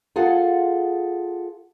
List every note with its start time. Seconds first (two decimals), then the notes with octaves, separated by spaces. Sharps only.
0.16 F4 G#4 A4 F#5